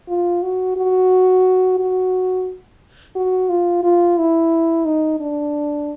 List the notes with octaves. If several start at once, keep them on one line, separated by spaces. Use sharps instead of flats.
F4
F#4
F#4
F#4
F#4
F4
F4
E4
D#4
D4